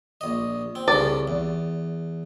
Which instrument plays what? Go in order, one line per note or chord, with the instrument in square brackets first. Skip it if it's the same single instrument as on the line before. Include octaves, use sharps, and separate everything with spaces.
[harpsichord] A#1 D#5
C4
[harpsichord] C2 C#3 [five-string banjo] D5
[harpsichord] E2